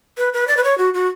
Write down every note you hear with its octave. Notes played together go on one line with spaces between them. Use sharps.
B4
B4
D5
B4
C#5
F#4
F#4